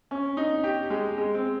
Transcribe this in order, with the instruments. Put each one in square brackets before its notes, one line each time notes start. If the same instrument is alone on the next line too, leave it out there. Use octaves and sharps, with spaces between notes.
[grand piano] C#4
D#4
G4
G#3
G#3
C4